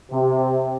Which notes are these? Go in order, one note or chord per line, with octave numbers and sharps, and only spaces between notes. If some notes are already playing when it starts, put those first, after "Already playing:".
C3